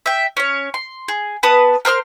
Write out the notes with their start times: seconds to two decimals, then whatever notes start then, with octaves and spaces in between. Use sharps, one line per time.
0.06 E5 G5
0.37 C#4 C#5
0.74 C6
1.08 G#4
1.43 B3 B4 A5 D#6
1.85 A#4 C5 D#6 F6